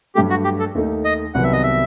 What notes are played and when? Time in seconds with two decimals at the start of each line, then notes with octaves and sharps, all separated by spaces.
0.15 G2 F#3 A3 G4
0.30 F#4
0.44 G4
0.60 A4
0.75 D#2 D#3 A3 D#4
1.05 D#5
1.34 C2 C3 D#3 F#3 B3 F#5
1.43 E5
1.53 D#5
1.63 E5